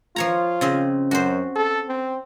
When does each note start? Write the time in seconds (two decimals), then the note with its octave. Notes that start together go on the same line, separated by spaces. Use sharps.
0.16 F3 F4 C#5 A#5
0.61 C#3 C4 D#5
1.11 F#2 F#4 C5
1.56 A4
1.89 C4